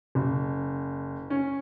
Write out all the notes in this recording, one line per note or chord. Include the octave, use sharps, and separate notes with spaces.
F#1
C#4